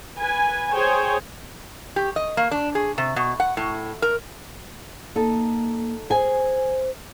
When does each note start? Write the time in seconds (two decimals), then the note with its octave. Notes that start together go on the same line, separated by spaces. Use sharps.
0.17 B4 G#5
0.70 G#4 C5 C#5 G5 G#5
1.96 G4
2.16 D#5
2.37 A#3
2.51 D4
2.75 G#4
2.98 C3
3.16 B2
3.40 F#5
3.57 A2
4.02 A#4
5.16 A#3 D#4 A4
6.10 G#4 C5 G#5